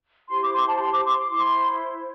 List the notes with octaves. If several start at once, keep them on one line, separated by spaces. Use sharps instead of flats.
E4 G4 C5 C6
D6
C6
A5
C6
D6
C6
D6
E4 C5 C6